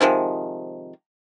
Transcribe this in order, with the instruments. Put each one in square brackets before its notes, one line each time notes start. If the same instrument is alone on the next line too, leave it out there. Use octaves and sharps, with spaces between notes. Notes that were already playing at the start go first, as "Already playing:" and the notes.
[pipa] C3 D#3 F3 G#3